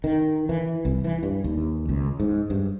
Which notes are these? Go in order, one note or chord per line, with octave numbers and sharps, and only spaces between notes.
D#3
E3
C2
E3
G2
D#2
C#2
G#2
G2